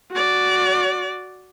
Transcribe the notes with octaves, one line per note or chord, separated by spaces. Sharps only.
F#4 D5